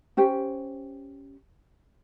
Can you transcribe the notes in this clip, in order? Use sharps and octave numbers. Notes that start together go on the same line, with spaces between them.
C#4 G4 C5 G5